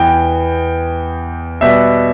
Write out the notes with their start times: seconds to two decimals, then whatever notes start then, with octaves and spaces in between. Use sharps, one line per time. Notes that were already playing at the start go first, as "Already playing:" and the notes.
Already playing: E2 E3 B3 G5
1.61 B2 G3 B3 E5